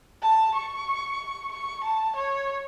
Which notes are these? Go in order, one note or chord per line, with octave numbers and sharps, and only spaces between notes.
A5
C#6
C#6
A5
C#5